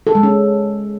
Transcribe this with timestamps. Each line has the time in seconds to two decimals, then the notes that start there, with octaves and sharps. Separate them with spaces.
0.07 A4
0.15 G#3
0.23 C#4